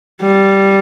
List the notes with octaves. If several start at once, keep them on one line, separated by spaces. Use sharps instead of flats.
G3